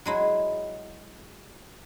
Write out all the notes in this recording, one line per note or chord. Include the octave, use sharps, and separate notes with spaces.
F#3 G#3 E4